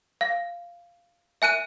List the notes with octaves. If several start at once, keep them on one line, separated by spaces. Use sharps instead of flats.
F5
E5 G#5 F#6 D#7